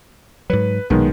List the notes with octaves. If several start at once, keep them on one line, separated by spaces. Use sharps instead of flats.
G#2 F#3 B4
B1 A#2 D#3 F#3 G#3 B3